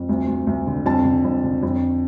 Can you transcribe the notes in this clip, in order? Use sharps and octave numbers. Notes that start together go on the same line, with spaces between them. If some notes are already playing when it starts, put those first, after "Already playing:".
Already playing: F2
D2
D2
D2
D3
F2 A5
D3
F2
D3
F2